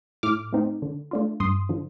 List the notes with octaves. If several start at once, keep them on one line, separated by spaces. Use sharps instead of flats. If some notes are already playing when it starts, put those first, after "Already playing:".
A2 D6 F6
A3 C4 D#4
D3
A3 D4 F4
G2 C6 D#6
D3 F3